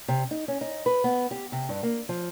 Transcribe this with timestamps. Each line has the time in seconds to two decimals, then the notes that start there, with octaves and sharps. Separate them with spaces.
0.08 C3
0.31 D#4
0.48 C#4
0.61 D#4
0.86 B4
1.04 B3
1.31 G4
1.52 C3
1.69 G2
1.83 A#3
2.09 F3